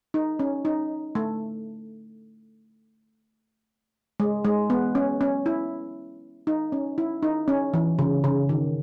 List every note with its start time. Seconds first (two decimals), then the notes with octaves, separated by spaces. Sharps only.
0.14 D#4
0.39 C#4
0.65 D#4
1.15 A3
4.20 G#3
4.45 G#3
4.70 B3
4.95 C#4
5.21 C#4
5.46 E4
6.47 D#4
6.72 C#4
6.98 E4
7.23 D#4
7.48 C#4
7.74 E3
7.99 C#3
8.24 C#3
8.49 D#3